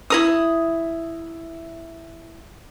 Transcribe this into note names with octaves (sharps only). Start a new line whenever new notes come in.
E4 A#4 D#6